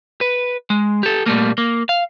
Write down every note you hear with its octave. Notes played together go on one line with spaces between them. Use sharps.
B4
G#3
G4 A4
A#2 G3 A3 A#3
A#3
F5